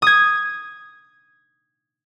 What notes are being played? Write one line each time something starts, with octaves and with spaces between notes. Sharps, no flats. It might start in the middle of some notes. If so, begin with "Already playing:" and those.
D#6 G#6